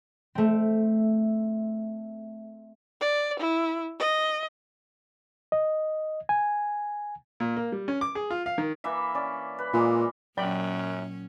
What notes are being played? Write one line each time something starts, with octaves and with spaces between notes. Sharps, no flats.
A3 C4
D5
E4
D#5
D#5
G#5
A#2
A#3
G3
C#4
D6
G#4
F4
F5
D#3
E3 A#3 E5
C#4 D5
B4
A#2 E3 G#3 A#3
F#2 A#2 F#3 C#4 D5 G5 B5